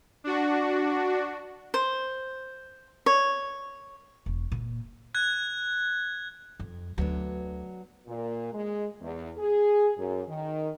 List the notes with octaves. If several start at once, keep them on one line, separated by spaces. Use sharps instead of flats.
D4 F#4
C5
C#5
E1
A#2
F#6 G#6
F2
D2 F#3 B3 D4
A#2
G#3
E2
G#4
F#2
D#3